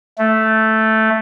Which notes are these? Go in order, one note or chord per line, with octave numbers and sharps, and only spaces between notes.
A3